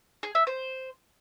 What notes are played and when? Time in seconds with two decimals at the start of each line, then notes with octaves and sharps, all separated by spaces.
0.23 G#4
0.35 E5
0.47 C5